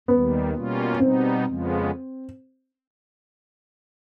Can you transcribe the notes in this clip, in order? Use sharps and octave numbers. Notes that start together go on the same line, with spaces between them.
D#2 D#3 G3 B3
B2 G3 A#3 C#4 F4
B2 G3 B3 C4 D#4
F2 C#3 F3 G#3 B3